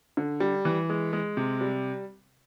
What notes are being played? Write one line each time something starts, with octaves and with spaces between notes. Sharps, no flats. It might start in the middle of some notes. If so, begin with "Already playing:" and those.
D3
G3
E3
G#3
G#3
C3
G3